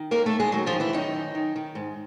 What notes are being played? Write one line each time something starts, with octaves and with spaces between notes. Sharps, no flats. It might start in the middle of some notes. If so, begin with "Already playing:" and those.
Already playing: D#3
D#2 A#3 A#4
A3 A4
D#2
G#3 G#4
D#3 F#3 F#4
F3 F4
D#3
E3 E4
F#2 D#3 D#4
F#2
D#3
D#3
G#2